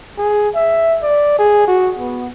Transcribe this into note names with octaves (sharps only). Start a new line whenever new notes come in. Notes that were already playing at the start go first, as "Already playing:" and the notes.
G#4
E5
D5
G#4
F#4
B3